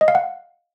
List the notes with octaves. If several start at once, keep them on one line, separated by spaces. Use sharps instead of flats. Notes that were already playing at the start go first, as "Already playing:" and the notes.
D#5
F5
F#5